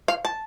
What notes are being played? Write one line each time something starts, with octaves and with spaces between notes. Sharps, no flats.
F5
A5